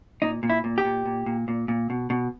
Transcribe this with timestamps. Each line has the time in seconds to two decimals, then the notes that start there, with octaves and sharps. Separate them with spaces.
0.22 A#2 D#4
0.43 A#2
0.50 E4
0.64 A#2
0.78 G4
0.85 A#2
1.06 A#2
1.26 A#2
1.48 A#2
1.68 A#2
1.90 B2
2.10 B2